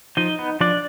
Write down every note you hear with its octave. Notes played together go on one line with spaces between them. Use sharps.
F3 D#4 D#5
B3
F3 D4 D5